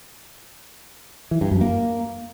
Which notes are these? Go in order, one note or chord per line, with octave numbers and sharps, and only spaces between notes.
E3
G2
F#2
A#3